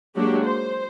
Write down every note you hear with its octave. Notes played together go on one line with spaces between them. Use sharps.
F#3 G#3 A#3 D4 F#4 G4
C5